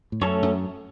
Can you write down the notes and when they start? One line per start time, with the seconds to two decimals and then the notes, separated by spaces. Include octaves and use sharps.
0.12 A2
0.21 F#2 A3 C#4 A4 C#5
0.42 F#2